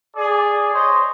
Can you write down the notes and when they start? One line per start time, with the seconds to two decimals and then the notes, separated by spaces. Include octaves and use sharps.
0.16 G#4 D5
0.73 C5 C#5 D#5